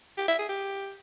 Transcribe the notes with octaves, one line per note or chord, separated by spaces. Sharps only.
G4
E5
G#4
G4